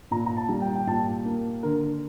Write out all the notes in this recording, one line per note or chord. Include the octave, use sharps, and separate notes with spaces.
A#2 A#5
A#5
A5
G3
G5
G5
A#2 A5
A#3
D3 A#4